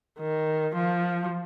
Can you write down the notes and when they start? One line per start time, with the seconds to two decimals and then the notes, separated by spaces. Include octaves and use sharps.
0.19 D#3
0.75 F3